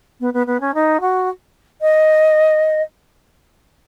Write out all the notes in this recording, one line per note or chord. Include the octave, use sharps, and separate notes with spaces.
B3
B3
B3
C#4
D#4
F#4
D#5